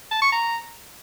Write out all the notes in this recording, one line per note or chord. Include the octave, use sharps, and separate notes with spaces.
A5
C#6
A#5